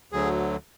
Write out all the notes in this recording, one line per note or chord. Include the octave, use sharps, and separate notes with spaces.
D2 D3 F#3 G#4